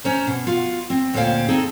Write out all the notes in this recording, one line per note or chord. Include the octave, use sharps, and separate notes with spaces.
C#4 C5 A#5
B2
F4 F#4 F5
C4
D2 A#2 C#4 C5 F5 G5
C4 D#4 G#4 A4